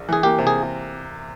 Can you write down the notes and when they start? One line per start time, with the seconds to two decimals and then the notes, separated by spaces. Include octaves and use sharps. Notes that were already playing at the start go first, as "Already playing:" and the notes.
Already playing: A#1
0.09 E3 G#4
0.23 A#3 G4
0.39 C3
0.47 G#4